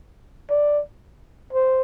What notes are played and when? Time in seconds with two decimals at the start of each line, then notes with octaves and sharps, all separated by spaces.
0.50 D5
1.53 C5